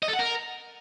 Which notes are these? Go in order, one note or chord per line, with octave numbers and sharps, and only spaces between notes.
D#5
A4
F#5
A#4